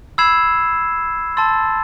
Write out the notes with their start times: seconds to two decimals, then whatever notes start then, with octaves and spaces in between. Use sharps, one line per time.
0.18 B5 E6 G#6 C7 E7
1.37 A5 C6 E6 A6